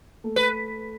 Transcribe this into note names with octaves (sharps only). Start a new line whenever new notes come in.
A3
B4